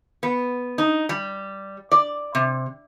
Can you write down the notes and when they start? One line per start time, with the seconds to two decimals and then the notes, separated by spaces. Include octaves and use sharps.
0.23 B3
0.78 D#4
1.09 G3
1.92 D5
2.35 C3